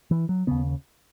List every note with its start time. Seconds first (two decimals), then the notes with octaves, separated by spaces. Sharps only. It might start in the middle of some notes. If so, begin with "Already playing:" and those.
0.11 E3
0.29 F#3
0.47 D#2 C#3 B3